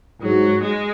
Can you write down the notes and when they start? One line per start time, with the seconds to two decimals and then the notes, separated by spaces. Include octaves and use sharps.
0.22 G#2 F#3
0.62 G#3